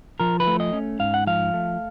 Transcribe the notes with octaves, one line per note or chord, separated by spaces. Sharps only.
F3 A#4
B4
A3
D#5
C#4
G#2 F5
F#5
F3 F5
A3